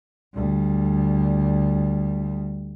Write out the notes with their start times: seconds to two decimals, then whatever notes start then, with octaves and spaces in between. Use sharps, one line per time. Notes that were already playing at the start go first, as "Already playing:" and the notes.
0.35 D2 G3